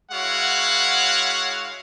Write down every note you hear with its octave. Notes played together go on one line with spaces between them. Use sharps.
G#3 E4 F#4 C#5 F5 F#5